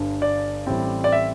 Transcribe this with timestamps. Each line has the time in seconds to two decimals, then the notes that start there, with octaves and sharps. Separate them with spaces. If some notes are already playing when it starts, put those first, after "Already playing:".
Already playing: G1 G2 D3
0.22 D5
0.67 A1 A2 G3 C4
1.04 D5
1.12 E5